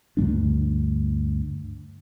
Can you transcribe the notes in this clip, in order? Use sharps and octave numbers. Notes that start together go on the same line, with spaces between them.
D2 G2 G#3 D4